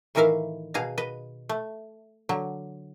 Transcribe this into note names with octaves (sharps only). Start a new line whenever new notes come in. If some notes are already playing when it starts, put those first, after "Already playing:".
A2 D#3 E3 A#4 E5 F5
B2 G#4 F5 A#5
B4 D#5
A3
D3 F#3